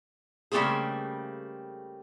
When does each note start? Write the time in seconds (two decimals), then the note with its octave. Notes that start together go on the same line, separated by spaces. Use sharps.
0.52 C#3 G3 A3 A#3 C4 G#4